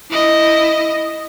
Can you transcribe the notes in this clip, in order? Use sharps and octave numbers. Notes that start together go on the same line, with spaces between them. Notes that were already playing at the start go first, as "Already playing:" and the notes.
E4 D#5